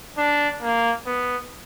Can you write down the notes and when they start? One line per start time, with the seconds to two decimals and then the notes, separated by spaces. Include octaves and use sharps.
0.18 D4
0.62 A#3
1.06 B3